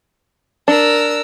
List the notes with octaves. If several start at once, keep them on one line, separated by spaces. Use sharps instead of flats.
D4 A#4 E6